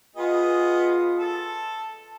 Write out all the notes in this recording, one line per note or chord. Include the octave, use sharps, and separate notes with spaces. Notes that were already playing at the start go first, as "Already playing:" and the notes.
B3 F4 G#4 D#5
A4